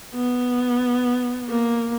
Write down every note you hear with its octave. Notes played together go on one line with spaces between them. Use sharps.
B3
A#3